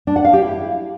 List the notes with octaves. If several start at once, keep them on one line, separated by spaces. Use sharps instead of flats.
D4
F#5
F5
G4
E4